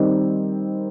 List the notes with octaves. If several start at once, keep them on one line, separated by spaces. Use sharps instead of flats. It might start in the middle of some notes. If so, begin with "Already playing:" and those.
Already playing: D#3 G3 C4 D#4